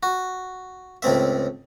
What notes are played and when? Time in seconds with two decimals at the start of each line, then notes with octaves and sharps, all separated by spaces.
0.03 F#4
1.02 C#2 A2 C4 E5